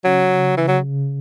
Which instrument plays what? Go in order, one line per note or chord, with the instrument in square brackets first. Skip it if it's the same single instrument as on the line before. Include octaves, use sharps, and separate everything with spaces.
[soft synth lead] C#3 [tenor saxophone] F#3
[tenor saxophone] E3
F#3